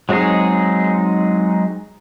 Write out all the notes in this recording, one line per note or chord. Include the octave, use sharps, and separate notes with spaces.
F#3 G#3 C4 D#4 G#4